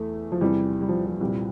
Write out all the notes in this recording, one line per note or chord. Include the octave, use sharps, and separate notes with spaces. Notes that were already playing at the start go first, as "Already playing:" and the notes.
Already playing: E2 E3 A3
F3
E2 C3 E3 G3
G3
F3
F3
C2 A#2 F3 G3